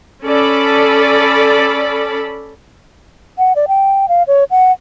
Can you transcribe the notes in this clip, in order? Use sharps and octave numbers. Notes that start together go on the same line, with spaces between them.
C#4 A4 D5 B5
F#5
D5
G5
F5
C#5
F#5